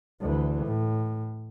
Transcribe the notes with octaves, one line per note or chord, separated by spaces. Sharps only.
D2 E3
A2